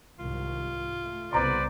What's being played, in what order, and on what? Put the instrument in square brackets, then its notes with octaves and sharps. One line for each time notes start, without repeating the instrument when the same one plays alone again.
[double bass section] C2 G#2 D#3 [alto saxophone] F4
[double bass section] A3
[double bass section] C2 C#3 B3 [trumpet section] B4 C5 D5 [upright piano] A#5 C6